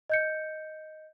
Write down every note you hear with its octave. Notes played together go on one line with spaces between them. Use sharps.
D#5 G6 C#7